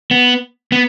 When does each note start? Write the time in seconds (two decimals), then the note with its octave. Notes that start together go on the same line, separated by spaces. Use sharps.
0.11 B3
0.72 B3